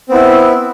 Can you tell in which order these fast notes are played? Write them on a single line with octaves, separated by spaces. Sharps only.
C4 B3 E4